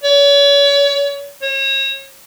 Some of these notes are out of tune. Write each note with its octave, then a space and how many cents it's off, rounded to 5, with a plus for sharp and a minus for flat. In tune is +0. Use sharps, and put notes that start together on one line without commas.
C#5 +35
C#5 -35